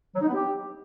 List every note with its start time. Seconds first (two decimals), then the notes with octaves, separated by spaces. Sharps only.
0.15 F#3
0.21 D#4
0.27 B3
0.33 G4